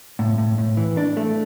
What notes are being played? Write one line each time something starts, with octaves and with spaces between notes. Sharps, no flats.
A2
A2
A2
E3
D4
A3